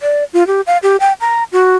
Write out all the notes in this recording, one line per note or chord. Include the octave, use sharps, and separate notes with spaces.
D5
F4
G4
F5
G4
G5
A#5
F#4